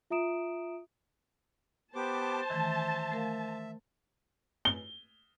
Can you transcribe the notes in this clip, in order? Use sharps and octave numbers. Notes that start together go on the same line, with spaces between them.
F4 E5 A#5 D#6 D7 E7
B3 G4 C5 A5 D6
D#3 E3 A3 E5
A3 A#4 F5
G7